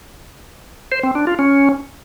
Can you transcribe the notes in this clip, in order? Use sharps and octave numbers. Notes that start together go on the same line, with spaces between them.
C5
C4
D4
F4
C#4